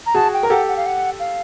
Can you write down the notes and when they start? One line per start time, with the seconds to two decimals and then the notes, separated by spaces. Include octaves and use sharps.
0.06 A#5
0.15 F#4 G#4 A5
0.33 G5
0.43 A#4
0.50 G4 A4 F#5
0.68 F#5
0.76 F5
0.86 F#5
1.19 F5